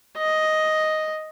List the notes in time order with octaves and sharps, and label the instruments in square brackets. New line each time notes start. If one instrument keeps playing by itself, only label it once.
[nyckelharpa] D#5